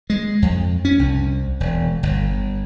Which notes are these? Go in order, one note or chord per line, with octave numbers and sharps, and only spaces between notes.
G#3
F2
C#4
C2
E1
G1